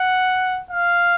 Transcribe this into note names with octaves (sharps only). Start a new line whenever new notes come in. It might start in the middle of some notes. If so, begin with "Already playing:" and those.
Already playing: F#5
F5